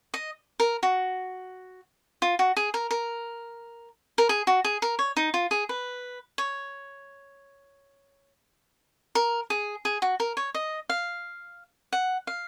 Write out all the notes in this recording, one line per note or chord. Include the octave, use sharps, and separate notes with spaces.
D#5
A#4
F#4
F4
F#4
G#4
A#4
A#4
A#4
G#4
F#4
G#4
A#4
C#5
D#4
F4
G#4
B4
C#5
A#4
G#4
G#4
F#4
A#4
C#5
D#5
F5
F#5
F5